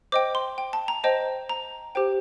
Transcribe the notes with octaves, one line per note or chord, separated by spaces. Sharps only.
C5 D#5 G5 D6
C6
G5
A5
A#5
C5 D#5 G5 A5
A#5
G4 C5 G5